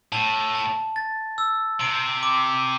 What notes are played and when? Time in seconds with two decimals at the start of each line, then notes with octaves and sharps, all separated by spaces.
0.12 A2 A5
0.55 A5
0.96 A6
1.38 E6
1.80 C3 D7
2.23 D6